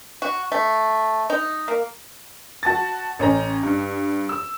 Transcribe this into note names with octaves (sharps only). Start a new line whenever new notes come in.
F#4
A3
D#4
A#3
F#4 A5 A6
A1 C#4 A#5
G2
E6